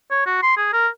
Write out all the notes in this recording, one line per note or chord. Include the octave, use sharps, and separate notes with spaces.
C#5
F#4
C6
G#4
A#4